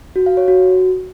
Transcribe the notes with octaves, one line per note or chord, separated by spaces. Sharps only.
F#4
F5
C#5
F#4